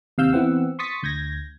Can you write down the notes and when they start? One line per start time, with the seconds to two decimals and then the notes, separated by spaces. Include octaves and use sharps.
0.18 D#2 C3 F5 E6 G6
0.32 E3 B3 C4 F#5 E6
0.79 C6 C#6 D#6 A6 B6 C#7
1.03 D2 G6 G#6 A#6